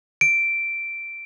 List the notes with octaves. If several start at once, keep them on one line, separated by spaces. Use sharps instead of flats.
D7